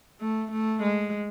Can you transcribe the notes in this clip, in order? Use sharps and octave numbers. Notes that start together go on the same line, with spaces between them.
A3
A3
G#3